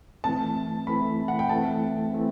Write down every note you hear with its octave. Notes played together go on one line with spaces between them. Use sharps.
E3 A3 C4 A5
E3 A3 C4 B5
F#5
G5
E3 A3 C4 A5
E3 A3 C4